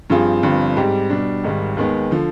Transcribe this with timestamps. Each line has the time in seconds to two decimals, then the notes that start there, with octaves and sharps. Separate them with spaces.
0.10 G2 F3 C4 F4 G#4
0.43 G1 G2 F3 C4
0.77 G#2 G3 C4 G4
1.10 B2 G3 D4
1.44 G#1 G#2 D#3 G3
1.77 D#2 D#3 G#3 B3
2.11 D3 F3